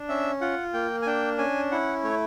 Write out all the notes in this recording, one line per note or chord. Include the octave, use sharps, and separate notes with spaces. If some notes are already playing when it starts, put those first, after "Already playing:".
Already playing: D4
C#4 E5
F4 F#5
A#3 G5
G#5
D4 G5
C#4 G#5
E4 F#5
A3 C#5